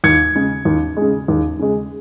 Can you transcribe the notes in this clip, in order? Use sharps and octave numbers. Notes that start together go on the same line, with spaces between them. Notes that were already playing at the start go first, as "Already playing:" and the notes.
D#2 G#6 C#7
C#3 G#3
D#2
C#3 G#3
D#2
C#3 G#3